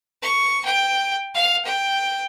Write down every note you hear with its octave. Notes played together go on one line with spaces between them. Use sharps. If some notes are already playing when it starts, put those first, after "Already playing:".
C#6
G5
F5
G5